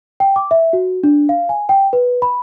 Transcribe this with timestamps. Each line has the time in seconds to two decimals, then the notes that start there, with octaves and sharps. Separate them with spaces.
0.20 G5
0.36 D6
0.51 E5
0.73 F#4
1.04 D4
1.29 F5
1.49 G#5
1.69 G5
1.93 B4
2.22 B5